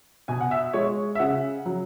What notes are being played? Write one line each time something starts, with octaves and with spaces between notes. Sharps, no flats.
B2 G#5
F#5
E5
G#3 C#5
E5
C#3 F#5
F#3